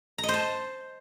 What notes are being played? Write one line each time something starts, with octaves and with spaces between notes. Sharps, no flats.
A#5
D#5
C5
A5